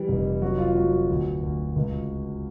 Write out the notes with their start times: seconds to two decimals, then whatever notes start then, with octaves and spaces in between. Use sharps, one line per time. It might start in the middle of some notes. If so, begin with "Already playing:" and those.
Already playing: E3 G3
0.08 F1
0.42 F#3 F#4
0.58 F4
0.75 F#3 F#4
0.93 F#4
1.09 D2
1.43 D2
1.76 C#2